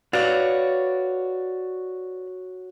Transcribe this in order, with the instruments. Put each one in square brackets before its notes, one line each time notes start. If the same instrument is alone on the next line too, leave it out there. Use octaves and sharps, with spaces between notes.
[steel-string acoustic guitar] F#4 C#5 [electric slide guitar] B4 D5 F5